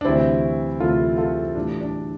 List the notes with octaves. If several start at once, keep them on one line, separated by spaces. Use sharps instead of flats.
D4
D2 C3 E3 G3 C4 E4
D2 C3 E3 G3 F4 A4
F4 A4
A2 E3 G3 D4
D4